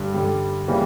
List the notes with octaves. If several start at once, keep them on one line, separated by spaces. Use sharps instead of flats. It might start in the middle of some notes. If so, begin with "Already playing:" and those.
Already playing: G2 D3 G3
G2 D3 G3
C#3 E3 G3 A#3